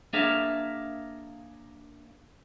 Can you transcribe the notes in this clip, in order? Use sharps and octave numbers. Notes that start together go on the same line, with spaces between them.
A#3 D4 G#4 A#4 E5 F5